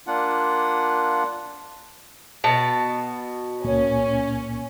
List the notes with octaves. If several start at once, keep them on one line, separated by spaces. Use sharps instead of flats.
A#3 D4 F4 F#5
B2 A5
C#2 A#2 A#3 C#4